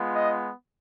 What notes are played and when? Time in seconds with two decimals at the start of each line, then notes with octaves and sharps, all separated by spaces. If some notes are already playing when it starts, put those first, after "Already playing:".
Already playing: G#3 B3 F4
0.15 D#5